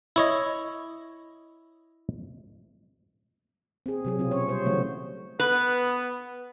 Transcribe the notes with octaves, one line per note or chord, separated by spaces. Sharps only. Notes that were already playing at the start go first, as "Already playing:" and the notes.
E4 C#5 D#5
C4 G#4
C3 F#3 G#4
B2 C4 F4
C#4 C#5
G3 C5
C#3 E3 F#3 A3 C#4 F#4
B3 B4